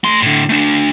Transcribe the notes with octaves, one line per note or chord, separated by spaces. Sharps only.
A3 C6
A2 D3
A3 D4